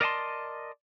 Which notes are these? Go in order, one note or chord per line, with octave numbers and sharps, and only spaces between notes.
A#4 D5 D#5 F5 A5 C6